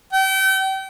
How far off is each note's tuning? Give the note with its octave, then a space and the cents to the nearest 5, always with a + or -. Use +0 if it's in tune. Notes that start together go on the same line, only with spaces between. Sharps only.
G5 -35